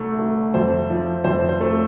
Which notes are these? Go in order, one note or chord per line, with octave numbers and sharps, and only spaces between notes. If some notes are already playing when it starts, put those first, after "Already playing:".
Already playing: C2 A3
A3
F2 C5
F3
F2 C5
C5
A3